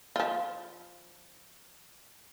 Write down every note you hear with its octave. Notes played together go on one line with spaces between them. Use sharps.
F3 F4